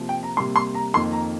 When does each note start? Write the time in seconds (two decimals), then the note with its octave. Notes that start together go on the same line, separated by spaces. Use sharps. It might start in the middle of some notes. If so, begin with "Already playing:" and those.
Already playing: C3 F3 A#3
0.09 G5
0.23 A#5
0.37 C3 G3 A#3 C6
0.56 C6
0.75 A#5
0.94 F2 D#3 A#3 C6
1.12 A#5